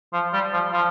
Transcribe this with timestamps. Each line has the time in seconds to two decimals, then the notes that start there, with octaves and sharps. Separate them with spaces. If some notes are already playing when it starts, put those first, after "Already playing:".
0.13 F3
0.33 G3
0.53 F3
0.73 F3